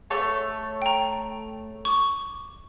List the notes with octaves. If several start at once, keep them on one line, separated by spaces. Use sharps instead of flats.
A3 C#5 A5
G5 A#5
C#6 D6